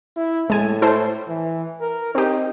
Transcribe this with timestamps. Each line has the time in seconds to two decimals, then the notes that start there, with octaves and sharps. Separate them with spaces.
0.17 E4
0.50 A2 G#3 G#5
0.82 E4 A4 C5
1.28 E3
1.81 A#4
2.15 C4 D#4 G4